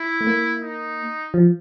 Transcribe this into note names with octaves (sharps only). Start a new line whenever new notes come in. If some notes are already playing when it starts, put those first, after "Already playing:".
Already playing: E4
A3
A#3
D#4
F3